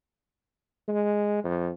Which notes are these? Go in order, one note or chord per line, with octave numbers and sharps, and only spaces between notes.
G#3
F2